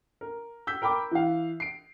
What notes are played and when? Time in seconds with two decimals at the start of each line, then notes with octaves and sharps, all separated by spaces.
0.21 A#4
0.67 E6 G6 B6
0.82 A#4 G5 B5 D6
1.11 E3 F5
1.60 C7 D7